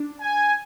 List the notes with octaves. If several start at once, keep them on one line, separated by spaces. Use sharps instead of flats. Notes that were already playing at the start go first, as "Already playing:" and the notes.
Already playing: D4
G#5